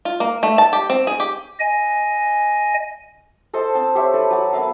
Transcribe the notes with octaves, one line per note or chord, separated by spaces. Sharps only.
F4
A#3
A3
A5
G4
C4
G#4
G4
D#5 G#5
A4 C5 D#5 A5
C4 A5 E6
G4 C5 C#5 E5
A4 B4 B5
F#3 A5
B3 A#4 E5 F5